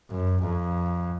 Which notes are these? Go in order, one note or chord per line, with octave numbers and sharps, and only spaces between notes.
F#2
F2